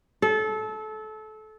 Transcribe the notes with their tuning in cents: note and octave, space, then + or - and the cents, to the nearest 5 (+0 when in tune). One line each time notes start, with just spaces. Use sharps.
A4 -25